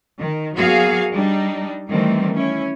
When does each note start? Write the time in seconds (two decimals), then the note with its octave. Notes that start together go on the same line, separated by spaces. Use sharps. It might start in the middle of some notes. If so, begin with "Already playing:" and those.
0.19 D#3
0.57 F#3 A#3 B3 F#4 G#4 F5
1.15 G3 D4 D#4
1.90 D#3 E3 G3 A3 C4
2.34 C#4 E4